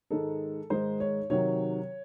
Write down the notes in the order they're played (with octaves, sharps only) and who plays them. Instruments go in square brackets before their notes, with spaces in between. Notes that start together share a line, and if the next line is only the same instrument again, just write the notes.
[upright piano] G#2 D#3 G#3 D#4 A4
G#2 D#3 G#3 D#4 C5
C#5
C3 D#3 F#3 C#5